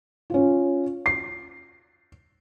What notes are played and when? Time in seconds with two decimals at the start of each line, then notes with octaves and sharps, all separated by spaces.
0.30 C#4 F4
1.06 C7